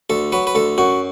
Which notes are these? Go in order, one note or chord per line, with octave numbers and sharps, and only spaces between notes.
D2 A4
F#3 B4
B4
D2 A4
F#2 F#4